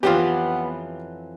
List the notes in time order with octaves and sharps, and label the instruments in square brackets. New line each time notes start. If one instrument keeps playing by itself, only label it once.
[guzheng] F2 E3 F#3 [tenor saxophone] B3 [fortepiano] F4 G4